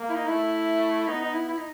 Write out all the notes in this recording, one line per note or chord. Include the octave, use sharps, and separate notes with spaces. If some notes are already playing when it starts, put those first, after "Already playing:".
Already playing: A#3
E4
D#4
A3 E4
B3 D#4
D#4
E4
E4
D#4